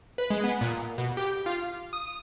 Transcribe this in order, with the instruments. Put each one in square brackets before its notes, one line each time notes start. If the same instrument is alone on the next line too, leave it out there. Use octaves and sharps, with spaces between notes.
[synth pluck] B4
G#3
B3
A#2
B2
G4
F4
D#6